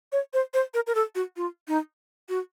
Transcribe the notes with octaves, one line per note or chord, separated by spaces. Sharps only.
C#5
C5
C5
A#4
A#4
A4
F#4
F4
D#4
F#4